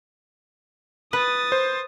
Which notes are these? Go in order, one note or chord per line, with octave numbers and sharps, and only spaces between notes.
B4 D#6 A6
C5